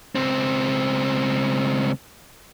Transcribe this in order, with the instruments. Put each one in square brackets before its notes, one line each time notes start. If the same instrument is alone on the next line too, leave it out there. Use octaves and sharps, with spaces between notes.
[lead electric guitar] C#2 C4